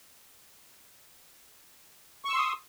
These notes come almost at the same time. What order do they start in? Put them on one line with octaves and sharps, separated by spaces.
C#6 E6 C6 D#6